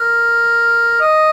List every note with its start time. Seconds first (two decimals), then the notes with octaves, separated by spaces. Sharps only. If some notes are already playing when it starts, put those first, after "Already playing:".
Already playing: A#4
1.00 D#5